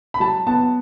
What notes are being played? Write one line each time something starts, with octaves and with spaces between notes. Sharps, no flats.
B5
F#3 A5
B3 A5